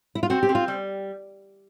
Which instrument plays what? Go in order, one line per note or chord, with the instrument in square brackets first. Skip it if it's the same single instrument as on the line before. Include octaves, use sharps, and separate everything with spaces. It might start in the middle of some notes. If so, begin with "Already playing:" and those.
[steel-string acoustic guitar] E4
F4
[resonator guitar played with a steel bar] C4 [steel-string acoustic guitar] F#4
[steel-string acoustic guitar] G4
[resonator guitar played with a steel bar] C4
[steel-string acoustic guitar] F4
[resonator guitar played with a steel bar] G3